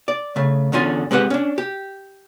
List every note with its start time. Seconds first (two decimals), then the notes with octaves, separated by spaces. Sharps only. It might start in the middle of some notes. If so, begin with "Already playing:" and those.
0.08 D5
0.36 C#3 A3
0.72 E2 D3 C#4 F4 G#5
1.11 G#3 C4 G4 B4 F#5
1.30 C#4 D4
1.58 G4